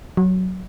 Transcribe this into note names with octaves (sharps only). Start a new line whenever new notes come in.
F#3